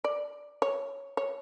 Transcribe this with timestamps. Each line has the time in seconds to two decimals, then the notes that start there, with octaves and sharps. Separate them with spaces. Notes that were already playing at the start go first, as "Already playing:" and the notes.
0.04 D5
0.62 C#5
1.17 C#5